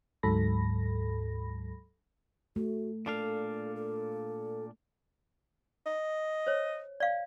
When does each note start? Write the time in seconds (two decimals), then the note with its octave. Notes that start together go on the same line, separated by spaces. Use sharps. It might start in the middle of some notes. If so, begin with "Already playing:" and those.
0.23 D2 G#2 F#3 A4 B5 A#6
2.56 A3 F#4
3.06 A#2 D4 A4 F5
3.76 A4
5.86 D#5
6.47 C5 C#5
7.00 D5 F5